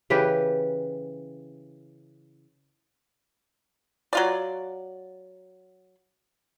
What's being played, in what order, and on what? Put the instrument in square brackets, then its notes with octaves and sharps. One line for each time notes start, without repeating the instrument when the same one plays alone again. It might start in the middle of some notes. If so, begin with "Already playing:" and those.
[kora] C#3 E3 G4 B4
[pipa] F#3 F4 D5